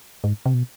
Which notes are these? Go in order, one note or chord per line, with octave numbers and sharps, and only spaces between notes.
G#2
C3
B2